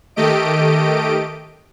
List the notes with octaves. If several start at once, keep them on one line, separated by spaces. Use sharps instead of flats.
D#3 A3 G4 D#5 D7